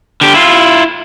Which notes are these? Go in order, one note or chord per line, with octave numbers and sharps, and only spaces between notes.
D3 G4
E4 F4